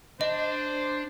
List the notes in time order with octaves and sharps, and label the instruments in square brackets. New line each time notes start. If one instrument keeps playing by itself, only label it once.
[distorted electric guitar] D4 [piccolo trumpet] C5 [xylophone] D#5